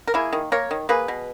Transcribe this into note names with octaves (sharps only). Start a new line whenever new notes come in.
A#4
A#3 E4 G#4
D#3
A#3 A#4 C#5
D#3
A#3 G#4 B4
B2